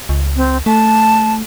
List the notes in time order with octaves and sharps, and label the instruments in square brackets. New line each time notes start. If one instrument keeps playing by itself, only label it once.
[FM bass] C#2
[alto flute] C4
[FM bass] A3 [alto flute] A5